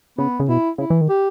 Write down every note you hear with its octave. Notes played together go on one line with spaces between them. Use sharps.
C#3 B3
C#3
B2 E4
C#3 E4
E3
D#3
G4